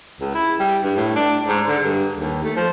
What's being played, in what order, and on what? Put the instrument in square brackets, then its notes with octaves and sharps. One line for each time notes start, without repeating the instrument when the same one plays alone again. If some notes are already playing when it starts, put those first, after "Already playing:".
[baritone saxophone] C#2
E4
G3
G2
A2
D4
G#2
D3
G2
D#2
A3
F3